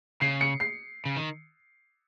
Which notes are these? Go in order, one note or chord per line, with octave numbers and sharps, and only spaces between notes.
C#3 C7
C#7
C7
C#3
D#3